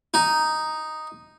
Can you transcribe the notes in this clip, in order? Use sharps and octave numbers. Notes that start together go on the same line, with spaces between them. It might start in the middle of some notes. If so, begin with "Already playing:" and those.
D#4